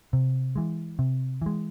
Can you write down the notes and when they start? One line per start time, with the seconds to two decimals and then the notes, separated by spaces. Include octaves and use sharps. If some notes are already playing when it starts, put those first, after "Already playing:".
0.13 C3
0.56 E3 G#3
0.99 C3
1.42 E3 G#3